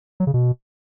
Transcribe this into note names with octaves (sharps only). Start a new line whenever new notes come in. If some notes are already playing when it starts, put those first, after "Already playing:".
F#3
C#3
B2